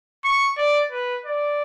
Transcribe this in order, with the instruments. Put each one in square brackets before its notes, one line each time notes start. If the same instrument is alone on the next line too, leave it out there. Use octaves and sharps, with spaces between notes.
[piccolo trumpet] C#6
D5
B4
D5